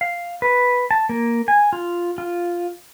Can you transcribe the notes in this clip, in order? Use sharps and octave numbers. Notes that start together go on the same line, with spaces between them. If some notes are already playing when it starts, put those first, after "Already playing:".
F5
B4
A5
A#3
G#5
F4
F4